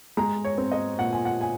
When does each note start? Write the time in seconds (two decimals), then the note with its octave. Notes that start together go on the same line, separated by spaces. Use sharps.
0.17 G#3 A#5
0.44 C#5
0.58 C4
0.72 D#5
0.99 A#2 F#5
1.13 G#5
1.25 F#5
1.41 G#5